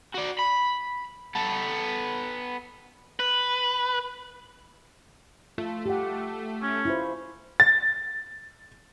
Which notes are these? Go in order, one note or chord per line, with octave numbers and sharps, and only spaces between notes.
F#4 D5
B5
B3 A4
B4
A3 F4
G4 F#5
C#4
E4 F4 C5
A6